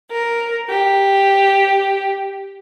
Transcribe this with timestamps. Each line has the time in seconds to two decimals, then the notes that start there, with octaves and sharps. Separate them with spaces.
0.11 A#4
0.67 G4